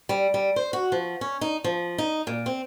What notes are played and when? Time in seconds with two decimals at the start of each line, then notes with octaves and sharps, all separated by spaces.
0.09 G3
0.34 G3
0.56 C5
0.73 F#4
0.92 F3
1.21 C#4
1.41 D#4
1.64 F3
1.98 D#4
2.27 A#2
2.46 C4